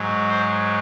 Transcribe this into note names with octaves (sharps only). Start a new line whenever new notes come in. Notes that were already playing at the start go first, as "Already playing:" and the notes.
Already playing: G#2 F#3
C5